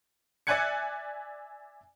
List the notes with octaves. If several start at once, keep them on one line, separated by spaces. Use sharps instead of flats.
D5 E5 G#5 F#6 G#6 C#7